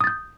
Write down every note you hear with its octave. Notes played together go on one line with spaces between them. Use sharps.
D#6 G6 A6